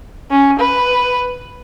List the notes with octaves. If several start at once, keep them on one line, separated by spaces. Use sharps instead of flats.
C#4
B4